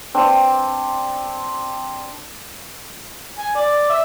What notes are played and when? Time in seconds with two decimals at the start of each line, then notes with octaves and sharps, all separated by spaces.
0.14 C4 D4
3.39 G#5
3.55 D5
3.90 E5